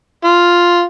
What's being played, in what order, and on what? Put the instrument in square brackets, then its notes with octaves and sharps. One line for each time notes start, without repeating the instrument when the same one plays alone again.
[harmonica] F4